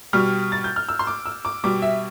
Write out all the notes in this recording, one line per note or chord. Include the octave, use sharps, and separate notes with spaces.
B2 G3 F6
A6
G6
F6
E6
C6
D6
E6
D6
B2 G3 D6
E5